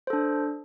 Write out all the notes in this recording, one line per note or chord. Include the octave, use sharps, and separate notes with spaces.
D4 A4 C5